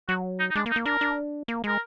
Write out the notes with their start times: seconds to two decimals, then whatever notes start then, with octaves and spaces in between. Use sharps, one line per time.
0.09 F#3 F#4
0.39 D#4
0.50 D#4
0.55 G#3 D4
0.66 A#3
0.71 D#4
0.76 A#3
0.86 D4 A#4
1.01 D4
1.48 A#3
1.64 G#3 A#4